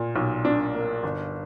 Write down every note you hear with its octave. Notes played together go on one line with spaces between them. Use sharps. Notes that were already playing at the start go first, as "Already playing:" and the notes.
Already playing: A#2 A#3
B1
D4
A#3
G1